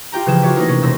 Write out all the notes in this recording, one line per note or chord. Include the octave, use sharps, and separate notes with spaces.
F4 G4 G5 A#5
C#3 E3 F3 G#4 G5 E7
F4 F#4 A4 C#5 D5 E5
A3 A#3 C#4 D#4 F4 A#4
C3 C#4
E1 C6 E6 A#6